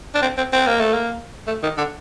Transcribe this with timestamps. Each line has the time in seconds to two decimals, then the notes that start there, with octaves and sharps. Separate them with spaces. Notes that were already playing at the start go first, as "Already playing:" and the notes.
0.14 D4
0.22 C4
0.37 C4
0.53 C4
0.67 A#3
0.80 A3
0.93 A#3
1.47 A3
1.63 D#3
1.78 D3